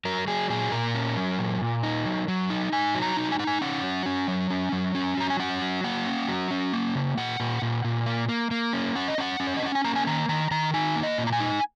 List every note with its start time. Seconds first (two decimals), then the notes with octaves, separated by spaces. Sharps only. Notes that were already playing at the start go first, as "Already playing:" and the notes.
0.05 F#3 A#4
0.27 F#3 G#4
0.50 A#2 G#4
0.72 A#2 A#4
0.94 C#4
1.17 F#3
1.39 A#2
1.61 A#2
1.83 D#4
2.05 F#3
2.28 F#3
2.50 D#4
2.72 D#4 G#5
2.95 F#3
3.02 A#5
3.17 D#4
3.32 G#5
3.39 D#4 F#5
3.47 G#5
3.61 C#4 F#5
3.83 F#3
4.06 C#4
4.28 F#3
4.50 C#4
4.72 F#3
4.95 C#4
5.17 F#3 A#5
5.30 G#5
5.40 C#4 F#5
5.62 F#3
5.84 A#3 F#5
6.06 C#4
6.28 F#3
6.51 C#4
6.73 A#3
6.95 C#3
7.17 A#2 F#5
7.40 A#2
7.62 A#2
7.84 A#2
8.06 A#3
8.29 A#3
8.51 A#3
8.73 C#4
8.95 C#4 F#5
9.08 D#5
9.18 C#4 F#5
9.40 C#4
9.47 C#5
9.57 D#5
9.63 C#4 F#5
9.75 G#5
9.84 A#3 A#5
9.96 G#5
10.07 D#3 A#5
10.29 D#3 A#5
10.51 D#3 A#5
10.74 D#4 G#5
10.96 A#3
11.03 D#5
11.18 A#2
11.27 A#5
11.33 G#5
11.40 D#4